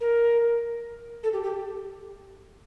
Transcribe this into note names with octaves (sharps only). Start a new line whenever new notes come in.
A#4
A4
G4
G4